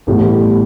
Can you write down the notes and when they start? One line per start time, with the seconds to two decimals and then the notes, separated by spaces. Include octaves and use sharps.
0.07 A1 A2 G3 B3